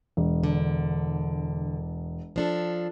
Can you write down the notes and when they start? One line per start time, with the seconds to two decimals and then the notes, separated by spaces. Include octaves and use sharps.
0.17 E1
0.44 D3
2.36 F3 D4 A4